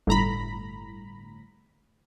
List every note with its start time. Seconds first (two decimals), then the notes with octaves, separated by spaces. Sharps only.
0.07 G1 A2 A#5 B5